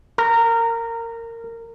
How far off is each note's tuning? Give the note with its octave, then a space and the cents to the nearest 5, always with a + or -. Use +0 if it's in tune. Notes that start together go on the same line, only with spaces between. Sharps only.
A#4 -20